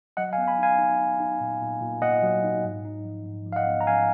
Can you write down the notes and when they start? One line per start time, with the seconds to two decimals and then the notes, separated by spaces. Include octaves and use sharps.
0.17 F#3 D#5 F#5
0.33 F5 G#5
0.38 B3
0.48 G#5 B5
0.58 D#4 F5 G#5
0.78 D#4
0.99 D#4
1.20 D#4
1.41 A#2
1.61 A#2
1.81 A#2
2.02 A#2 D#5 F#5
2.23 F#3
2.44 D#4
2.64 G#2
2.85 D#4
3.05 F3
3.26 G#2
3.46 F3
3.52 F5
3.56 D#5 F#5
3.66 B3
3.81 A#5
3.87 F3 F5 G#5